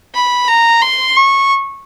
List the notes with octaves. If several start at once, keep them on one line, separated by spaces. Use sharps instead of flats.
B5
A#5
C6
C#6